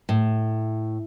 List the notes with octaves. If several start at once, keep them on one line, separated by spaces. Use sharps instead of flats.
A2